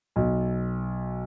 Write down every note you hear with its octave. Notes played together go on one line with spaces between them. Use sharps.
B1